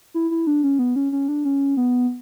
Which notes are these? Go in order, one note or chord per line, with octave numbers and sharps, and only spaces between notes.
E4
E4
D4
C#4
B3
C#4
C#4
D4
C#4
B3